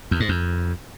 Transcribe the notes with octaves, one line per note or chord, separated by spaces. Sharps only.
E2
G#2
F2